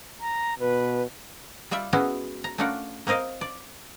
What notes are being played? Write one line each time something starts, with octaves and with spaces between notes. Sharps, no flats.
A#5
B2 B4
G3 F4 D5 E5
G#3 B3 C#4 E4 F#4 G#4
A#5
A3 C#4 D4 F4 A#4 F#5
A#3 C4 A#4 D#5 F5
D5